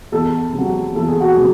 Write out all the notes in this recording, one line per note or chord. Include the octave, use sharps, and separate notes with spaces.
E2 A4
C3
F#3
E2 A4
G#4
F#4
C3 F#3 G#4